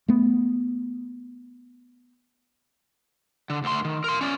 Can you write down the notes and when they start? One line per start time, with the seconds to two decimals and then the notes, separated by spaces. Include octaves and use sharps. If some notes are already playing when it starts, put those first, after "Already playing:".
0.08 A3 B3
3.50 D3
3.64 D2 C6
3.85 D#3
4.04 A#4 C6
4.21 C#4 D5